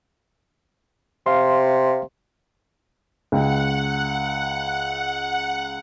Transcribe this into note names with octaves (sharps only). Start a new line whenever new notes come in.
C3 F5 C6
C#2 F#5 G5